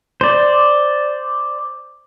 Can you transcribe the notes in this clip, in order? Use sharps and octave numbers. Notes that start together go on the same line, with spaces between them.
C5 D5